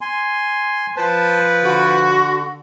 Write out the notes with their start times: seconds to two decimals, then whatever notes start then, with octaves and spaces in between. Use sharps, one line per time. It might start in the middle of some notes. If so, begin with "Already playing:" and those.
0.01 G#5 C6
0.97 F3 B4 C5 A5
1.63 D3 F#4